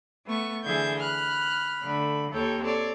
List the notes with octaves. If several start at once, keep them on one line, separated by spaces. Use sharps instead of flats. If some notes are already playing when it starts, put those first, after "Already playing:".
A3 B3 C#6
D3 E3 G#4 E5 G6 G#6
B5 F6 F#6
D3 A3 B5
D#2 A4 C#5 G5
C4 A4 C#5 D5